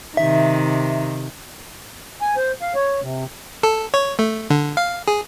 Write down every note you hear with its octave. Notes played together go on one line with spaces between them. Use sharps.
C3 D#3 E5
G#5
C5
F5
C#5
C3
A4
C#5
A3
D3
F5
G#4